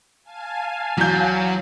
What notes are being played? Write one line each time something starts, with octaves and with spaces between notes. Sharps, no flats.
F5 G#5 A5
E2 F#3 G6